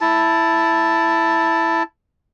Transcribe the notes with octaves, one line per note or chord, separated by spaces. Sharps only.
E4 A5